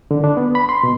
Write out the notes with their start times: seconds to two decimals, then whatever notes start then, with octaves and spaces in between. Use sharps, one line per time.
0.11 D3
0.24 D4
0.37 B3
0.55 B5
0.69 C6
0.83 B2